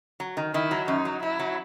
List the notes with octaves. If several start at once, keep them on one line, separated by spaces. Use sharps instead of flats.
F#3
D#3
D#3 E4
F#3
F#2 D#4
F#3
F#3 E4
F#3